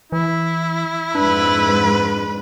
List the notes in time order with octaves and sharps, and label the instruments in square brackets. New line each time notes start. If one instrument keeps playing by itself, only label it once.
[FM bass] E3 [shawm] E4
[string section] F2 G#2 [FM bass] D4 [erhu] B4